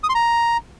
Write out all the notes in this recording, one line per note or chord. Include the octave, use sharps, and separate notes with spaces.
D#6
C6
A#5